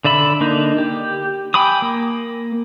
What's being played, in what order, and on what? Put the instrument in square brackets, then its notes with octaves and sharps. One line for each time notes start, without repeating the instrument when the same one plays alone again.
[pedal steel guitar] D3 D5 E5 B5
D3 A#3 D4 D#4
G4
G5 G#5 B5 D6 D#6
A#3